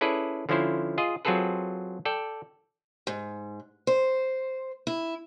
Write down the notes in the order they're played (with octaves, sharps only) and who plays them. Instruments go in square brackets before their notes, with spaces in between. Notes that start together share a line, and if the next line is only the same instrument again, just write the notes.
[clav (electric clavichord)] C#4 E4 G#4 A4 B4 D5
D3 F3 C#4 E4 C5
F4 G#4 D#5
F#3 C4 F4 G#4 A4 B4
A4 D5 G5
[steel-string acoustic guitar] G#2
C5
E4